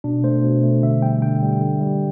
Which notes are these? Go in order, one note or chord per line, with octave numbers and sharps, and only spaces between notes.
B2 D4
A3 C5
B2
A3
D3 E5
G3 G5
D3 G5
G3
D3
G3